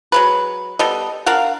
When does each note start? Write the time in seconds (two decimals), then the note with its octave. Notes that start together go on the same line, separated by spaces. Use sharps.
0.12 F#3 G#3 B4
0.79 G3 B3 A4 D#5
1.26 D4 A#4 F5 F#5